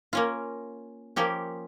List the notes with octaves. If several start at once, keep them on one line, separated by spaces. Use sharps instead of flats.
A#3 C#4 F4
F3 A#3 C#4 G4